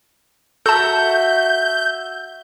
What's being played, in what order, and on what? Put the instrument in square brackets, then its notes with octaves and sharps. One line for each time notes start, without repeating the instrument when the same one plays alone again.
[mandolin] F#4 E5 [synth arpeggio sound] A4 A5 [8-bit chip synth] G6